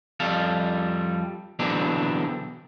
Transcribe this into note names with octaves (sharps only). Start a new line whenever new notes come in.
F2 G3 A4 F5
B2 D3 E3 F#3 C4 D4